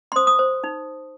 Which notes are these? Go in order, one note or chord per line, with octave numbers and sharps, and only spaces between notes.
C6
C5 D#6
D#6
C5
D#4